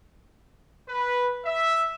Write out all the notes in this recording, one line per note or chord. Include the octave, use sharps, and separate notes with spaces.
B4
E5